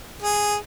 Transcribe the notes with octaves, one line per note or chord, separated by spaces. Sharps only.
G#4